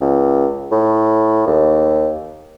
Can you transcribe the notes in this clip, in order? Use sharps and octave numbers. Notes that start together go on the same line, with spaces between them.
C#2
A2
D#2